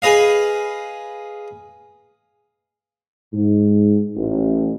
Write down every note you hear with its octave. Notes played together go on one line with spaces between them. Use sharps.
G#4 B4 D#5 F5
G#2
A1